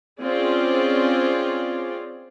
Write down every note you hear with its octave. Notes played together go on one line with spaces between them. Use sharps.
C4 C#4 F4 G#4 D5